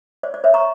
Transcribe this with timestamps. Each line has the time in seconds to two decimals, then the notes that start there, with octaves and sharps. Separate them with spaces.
0.23 C#5 D5
0.34 D5
0.44 C#5 E5
0.54 A#5 C#6